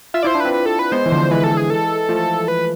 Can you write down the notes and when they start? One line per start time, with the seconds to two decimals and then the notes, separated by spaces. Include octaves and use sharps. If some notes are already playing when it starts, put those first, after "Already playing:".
0.14 F4 E5
0.23 E4 C5 D5
0.35 D4
0.40 C4 E4 B4
0.54 B4
0.66 A4
0.79 B4
0.92 G#3 B3 C5
1.06 E3
1.12 D3 F3
1.31 E3 G#3 B4
1.44 A4
1.57 G#4
1.70 A4
2.09 F3 A3
2.48 B4